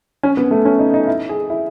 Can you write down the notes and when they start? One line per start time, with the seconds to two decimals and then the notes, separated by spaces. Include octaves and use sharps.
0.23 C#4
0.37 B3
0.51 A3
0.65 C#4
0.79 D#4
0.94 D#4
1.08 E4
1.29 G#4
1.50 E4